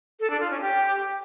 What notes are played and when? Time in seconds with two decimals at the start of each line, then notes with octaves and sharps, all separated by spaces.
0.20 A4
0.30 D4
0.40 F4
0.51 C#4
0.61 G4